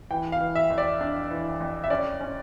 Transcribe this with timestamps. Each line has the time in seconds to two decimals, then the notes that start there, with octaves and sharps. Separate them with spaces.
0.11 E3 G5
0.32 F5
0.41 E3
0.55 E5
0.70 F2
0.78 D5
1.01 D4
1.30 E3
1.60 F2
1.84 E5
1.90 C#4 D5
2.20 C#4